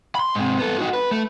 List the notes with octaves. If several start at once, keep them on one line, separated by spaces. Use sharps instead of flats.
B5 C6
G#2 C3
B3 A4
D#4 F#4
B4
A3